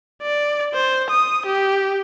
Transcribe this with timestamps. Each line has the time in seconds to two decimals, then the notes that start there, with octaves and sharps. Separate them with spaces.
0.23 D5
0.74 C5
1.10 D#6
1.46 G4